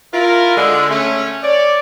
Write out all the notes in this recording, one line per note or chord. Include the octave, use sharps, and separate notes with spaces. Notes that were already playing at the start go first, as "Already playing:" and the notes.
E4 F4 A#4
D3 G#3
A3 C#4
C#5 D5